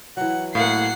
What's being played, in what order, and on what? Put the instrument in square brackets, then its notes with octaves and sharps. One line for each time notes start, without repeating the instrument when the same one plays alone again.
[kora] E3 F#3 [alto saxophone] F#5
[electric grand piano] A2 [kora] A#3 B4 [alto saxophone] F5 [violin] F#5 C7